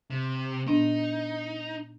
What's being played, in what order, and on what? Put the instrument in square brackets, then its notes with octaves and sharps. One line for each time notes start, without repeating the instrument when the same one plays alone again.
[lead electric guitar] C3
[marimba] A#2 B3 D4 [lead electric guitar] D#4